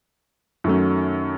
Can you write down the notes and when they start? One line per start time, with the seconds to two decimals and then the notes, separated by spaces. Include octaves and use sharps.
0.64 F#2 D#3 F#3 A3 C#4